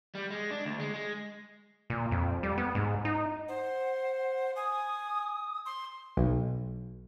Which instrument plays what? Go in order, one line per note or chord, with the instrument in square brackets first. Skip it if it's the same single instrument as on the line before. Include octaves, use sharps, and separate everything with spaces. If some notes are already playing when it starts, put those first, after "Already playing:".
[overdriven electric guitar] G3
G#3
D4
D2
G#3
G#3
[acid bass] A#2
F2
G3
B3
G#2
D#4
[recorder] C5 [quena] F#5
[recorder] G#5 [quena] D#6
[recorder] C6
[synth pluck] B1